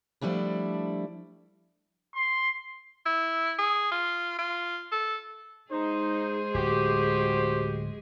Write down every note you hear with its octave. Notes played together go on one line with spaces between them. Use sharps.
F3 G3 A3 D4 E4
C6
E4
G#4
F4
F4
A4
G#3 D#4 G#4 C5
D1 F#4 G4